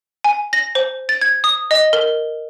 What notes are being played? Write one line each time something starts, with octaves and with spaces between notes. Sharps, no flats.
G#5
A#6
C5
A6
G#6
D#6
D#5
A#4